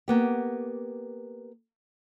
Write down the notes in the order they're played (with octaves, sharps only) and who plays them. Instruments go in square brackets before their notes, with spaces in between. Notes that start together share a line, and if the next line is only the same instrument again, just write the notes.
[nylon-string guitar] A#3 B3 G4